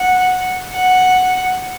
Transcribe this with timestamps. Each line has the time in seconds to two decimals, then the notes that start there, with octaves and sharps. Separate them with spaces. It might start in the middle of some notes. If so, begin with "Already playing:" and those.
Already playing: F#5
0.73 F#5